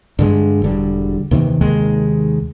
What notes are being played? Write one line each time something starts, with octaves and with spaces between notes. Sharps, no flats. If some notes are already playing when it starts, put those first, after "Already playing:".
G2 D3 G#3
E1 D3 G3
D#2 C3 D#3 E3
D#2 C3 D#3 G#3